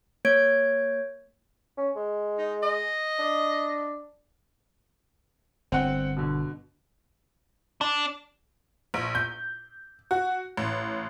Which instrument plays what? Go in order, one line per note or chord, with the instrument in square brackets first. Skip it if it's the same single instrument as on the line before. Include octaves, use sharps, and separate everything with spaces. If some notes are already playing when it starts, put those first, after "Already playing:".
[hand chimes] A#3 C#5 G#6 D7
[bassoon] C#4
G#3
[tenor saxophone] D#4
D#5
[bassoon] D4
[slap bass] G1 [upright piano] C4 F#5 G5
[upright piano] B2 D3
[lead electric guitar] D4
[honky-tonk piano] A#1
G6
F#4
A1